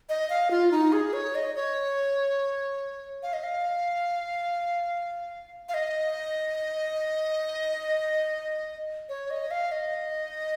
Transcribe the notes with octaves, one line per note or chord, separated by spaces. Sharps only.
D#5
F5
F4
D#4
G#4
C#5
D#5
C#5
F5
D#5
F5
F5
D#5
C#5
D#5
F5
D#5